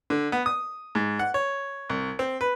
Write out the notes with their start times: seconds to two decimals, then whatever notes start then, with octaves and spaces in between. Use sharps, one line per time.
0.10 D3
0.32 B3
0.46 D#6
0.95 G#2
1.19 F#5
1.34 C#5
1.89 C2
2.19 C4
2.41 B4